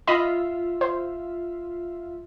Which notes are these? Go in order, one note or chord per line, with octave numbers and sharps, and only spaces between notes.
F4 D#5 E5 B5
C5